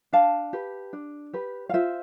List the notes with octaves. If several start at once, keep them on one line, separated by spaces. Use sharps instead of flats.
D4 F5 A5
G4 B4
D4
G4 B4
F5
F4 C5 E5